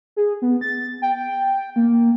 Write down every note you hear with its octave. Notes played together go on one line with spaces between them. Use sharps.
G#4
B3
A6
G5
A#3